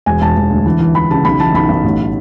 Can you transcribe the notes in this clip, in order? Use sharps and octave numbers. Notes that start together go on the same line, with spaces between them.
E1 G#5
E1 A5
E1
D2
E3
E3
E3 B5
C#3 A5
B1 B5
E3 A5
B1 B5
B1
A1